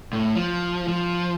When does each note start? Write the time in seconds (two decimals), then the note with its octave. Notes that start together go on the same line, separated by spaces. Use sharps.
0.13 A2
0.36 F3
0.88 F3